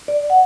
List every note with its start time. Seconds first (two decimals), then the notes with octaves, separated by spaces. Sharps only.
0.08 D5
0.30 F#5